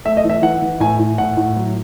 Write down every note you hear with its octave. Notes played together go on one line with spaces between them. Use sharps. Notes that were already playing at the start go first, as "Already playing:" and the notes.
A3 E5
D#5
E3
E5
E3 F#5
E3
A2 G#5
A2
A2 F#5
A2
F#3